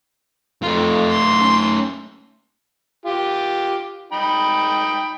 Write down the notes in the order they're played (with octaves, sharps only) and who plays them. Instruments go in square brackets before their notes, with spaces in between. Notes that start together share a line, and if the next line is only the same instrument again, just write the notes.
[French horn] F2 [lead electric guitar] A3 F4
[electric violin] C6
[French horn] C#4
[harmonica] F4 G4
D#4 G5 B5